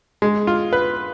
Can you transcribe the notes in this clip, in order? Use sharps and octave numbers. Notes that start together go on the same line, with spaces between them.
G#3
F4
B4